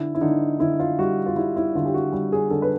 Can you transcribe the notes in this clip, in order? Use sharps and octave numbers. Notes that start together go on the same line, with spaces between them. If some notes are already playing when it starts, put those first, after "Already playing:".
Already playing: D3 E4
E4
D3 D#4
D3 E4
F4
G3 F#4
F4
G3 E4
E4
D3 F4
G4
F#4
G3 G4
G#4
D3 A4
B4